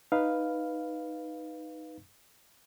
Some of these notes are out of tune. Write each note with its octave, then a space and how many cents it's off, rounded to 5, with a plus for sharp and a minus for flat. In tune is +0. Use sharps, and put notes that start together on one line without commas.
D#4 +0 B4 +0 F5 +0